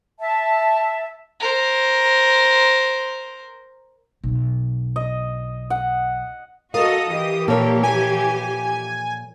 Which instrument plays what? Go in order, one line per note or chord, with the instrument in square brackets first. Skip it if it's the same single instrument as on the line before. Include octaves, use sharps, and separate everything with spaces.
[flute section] E5 A5
[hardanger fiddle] A#4 C5
[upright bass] B1
[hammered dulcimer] D#5
F#5
[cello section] F#4 A4 D#5 [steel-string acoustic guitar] A#4 F5 [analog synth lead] D#6
[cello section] E3 G4
[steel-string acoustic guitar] A#2 F3 C#5 [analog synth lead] A#3 [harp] A4 A#4
[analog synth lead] G#5